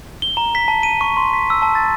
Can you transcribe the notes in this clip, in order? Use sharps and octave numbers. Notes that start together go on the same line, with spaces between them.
G7
A#5
B6
A5
D#7
C#6
C6
B6
E6
A5
A6